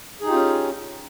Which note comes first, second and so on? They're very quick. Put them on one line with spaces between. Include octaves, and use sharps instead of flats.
G#4 D#4 G4 F4 C#4